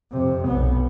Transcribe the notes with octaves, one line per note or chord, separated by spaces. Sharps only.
F2 C3
B1 B3